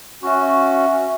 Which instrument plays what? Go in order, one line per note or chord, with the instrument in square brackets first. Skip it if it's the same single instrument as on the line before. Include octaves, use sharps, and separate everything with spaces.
[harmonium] C#4 F#4 [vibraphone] E5 C#6